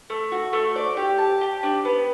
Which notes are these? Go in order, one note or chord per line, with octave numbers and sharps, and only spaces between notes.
A3
F#4
A3
D5
G4
A5
G4
D4
B3